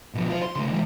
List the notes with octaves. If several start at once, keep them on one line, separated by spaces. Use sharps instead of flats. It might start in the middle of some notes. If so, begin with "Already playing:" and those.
B2 F3
F4 C5
C6
C#3 A3
E3 G#3